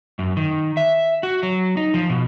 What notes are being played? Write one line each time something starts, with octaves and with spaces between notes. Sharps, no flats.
F#2
D#3
E5
F#4
F#3
D#4
F3
B2